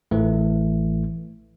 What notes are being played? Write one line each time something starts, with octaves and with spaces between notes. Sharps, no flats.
A1 A2 E3 A3